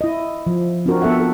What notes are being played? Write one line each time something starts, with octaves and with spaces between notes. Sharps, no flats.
E4 D#5
F3
C4 D4 F4 F#4 A#4
B3 A4 E5 F#5
A4